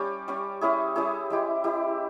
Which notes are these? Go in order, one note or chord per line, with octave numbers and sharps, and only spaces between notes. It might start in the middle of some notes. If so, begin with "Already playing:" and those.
Already playing: G3 C#4 G4
G3 C#4 G4
G3 C#4 E4 G#4
G3 C#4 E4 G#4
G#3 E4 G4
G#3 E4 G4